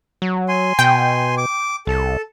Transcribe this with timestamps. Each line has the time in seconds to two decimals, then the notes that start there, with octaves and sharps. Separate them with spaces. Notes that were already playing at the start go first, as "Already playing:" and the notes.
0.22 F#3
0.48 G#5 C6
0.79 B2 G5
1.38 D6
1.87 C2 A4